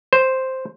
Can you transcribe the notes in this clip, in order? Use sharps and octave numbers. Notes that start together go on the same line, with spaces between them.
C5